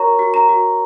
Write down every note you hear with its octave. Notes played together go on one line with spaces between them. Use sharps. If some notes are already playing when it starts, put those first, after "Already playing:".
Already playing: F#4 A#4 C#5 A#5 C#6
F#4
A#5
F#4